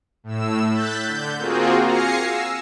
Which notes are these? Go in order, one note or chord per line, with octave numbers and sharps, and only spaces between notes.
A2 E6
F#6 G6 A6 B6
D3 G6
A#3 C4 F4 F#4 G#4
F5 G#5 A#6 C7 C#7
E6